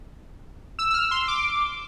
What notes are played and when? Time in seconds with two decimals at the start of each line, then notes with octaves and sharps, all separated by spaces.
0.79 E6
0.90 E6
0.94 F6
1.11 C6
1.28 D6